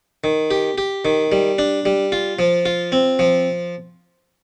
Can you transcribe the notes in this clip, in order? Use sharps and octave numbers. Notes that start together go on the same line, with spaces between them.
D#3
G4
G4
D#3
G3
D4
G3
F4
F3
F4
C4
F3